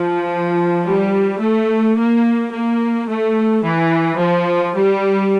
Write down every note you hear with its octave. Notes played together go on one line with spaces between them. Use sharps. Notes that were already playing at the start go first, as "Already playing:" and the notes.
Already playing: F3
G3
A3
A#3
A#3
A3
E3
F3
G3